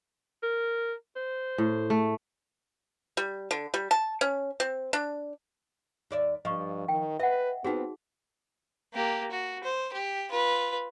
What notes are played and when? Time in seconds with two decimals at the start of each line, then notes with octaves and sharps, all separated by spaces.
0.43 A#4
1.16 C5
1.58 A2
1.90 A3
3.17 G3
3.51 D3
3.74 G3
3.91 A5
4.21 C#4
4.60 C4
4.93 D4
6.11 D#2 D5 E5
6.45 G2 F3 D#5 C#6
6.88 D#3 G5
7.20 B4 D#5 E5 F#5
7.64 B3 C4 D#4 F4 F#4 G#4
8.93 A#3 G4
9.31 F#4
9.64 C5
9.93 G4
10.29 F4 B4